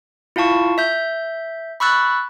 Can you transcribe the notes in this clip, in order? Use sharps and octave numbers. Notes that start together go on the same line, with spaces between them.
E4 F4 F5 A5 C#6
E5 G6
B5 C#6 E6 F#6 A6